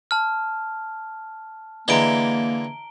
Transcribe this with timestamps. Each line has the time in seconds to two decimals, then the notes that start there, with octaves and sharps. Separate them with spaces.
0.11 A5 F6
1.88 D3 E3 G#3 A#3 A#5 D7 G7